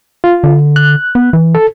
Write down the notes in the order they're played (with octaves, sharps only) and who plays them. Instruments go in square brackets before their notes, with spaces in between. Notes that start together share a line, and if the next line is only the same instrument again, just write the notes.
[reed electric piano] F4
[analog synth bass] D3
[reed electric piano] F#6
[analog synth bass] B3
E3
[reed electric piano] A4